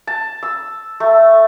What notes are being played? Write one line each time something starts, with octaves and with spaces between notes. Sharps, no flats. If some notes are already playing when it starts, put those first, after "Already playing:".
A5
E6
A3